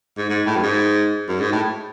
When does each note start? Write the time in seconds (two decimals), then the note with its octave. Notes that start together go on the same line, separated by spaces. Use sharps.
0.17 G#2
0.29 G#2
0.46 A2
0.56 F#2
0.62 G#2
1.28 F#2
1.40 G#2
1.52 A2